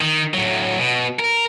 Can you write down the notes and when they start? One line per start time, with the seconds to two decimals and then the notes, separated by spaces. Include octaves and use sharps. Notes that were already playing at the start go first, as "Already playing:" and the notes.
0.01 D#3
0.34 A2 F#3
0.78 B2
1.19 A#4